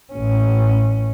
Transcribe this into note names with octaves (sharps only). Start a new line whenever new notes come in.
A1 C#4